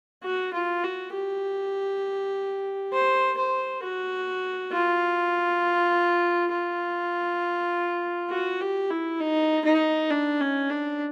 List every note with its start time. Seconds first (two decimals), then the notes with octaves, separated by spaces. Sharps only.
0.24 F#4
0.53 F4
0.84 F#4
1.13 G4
2.93 C5
3.38 C5
3.83 F#4
4.72 F4
6.52 F4
8.31 F#4
8.61 G4
8.90 E4
9.20 D#4
9.65 D#4
10.10 D4
10.40 C#4
10.70 D4